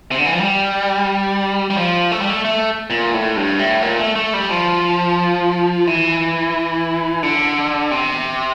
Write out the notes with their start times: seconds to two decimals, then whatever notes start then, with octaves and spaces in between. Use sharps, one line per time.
0.11 C3
0.19 D3
0.26 E3
0.33 F3
0.41 G3
1.70 G3
1.77 F3
2.12 A3
2.21 G3
2.30 A3
2.45 A3
2.90 A#2
3.14 A2
3.36 G2
3.59 A2
3.82 A#2
3.99 A3
4.16 A3
4.34 G3
4.49 F3
5.87 E3
7.23 D3
7.91 C3